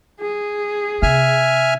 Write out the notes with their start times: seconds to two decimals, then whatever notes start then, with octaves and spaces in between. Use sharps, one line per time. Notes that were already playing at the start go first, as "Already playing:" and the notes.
0.21 G#4
1.02 C3 E5 G#5 F6